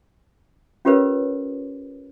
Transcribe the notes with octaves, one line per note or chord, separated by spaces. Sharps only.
C#4 F4 G4 A#4 B4 C#5